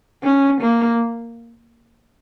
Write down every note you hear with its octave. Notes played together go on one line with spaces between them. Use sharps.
C#4
A#3